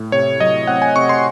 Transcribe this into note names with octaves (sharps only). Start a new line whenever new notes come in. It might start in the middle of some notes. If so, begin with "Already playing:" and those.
Already playing: A2
C3 C#5
F#3 D#5
C4 F#5
G#5
C3 C#6
C6